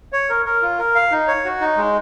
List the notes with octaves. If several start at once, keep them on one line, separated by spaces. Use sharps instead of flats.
C#5
A#4
A#4
F4
A#4
F5
D#4
C#5
F#4
D#4
G#3